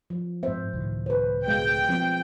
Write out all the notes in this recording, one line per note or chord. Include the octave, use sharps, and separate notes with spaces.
F3
G#2 C4 C5 E5
C#2 A2 D#3
B4 C5
B2 G#3 F5 G5
F3 C4